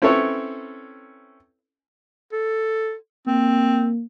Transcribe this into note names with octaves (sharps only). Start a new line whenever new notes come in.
C4 C#4 E4 A4 B4 C#5
A4
A#3 C4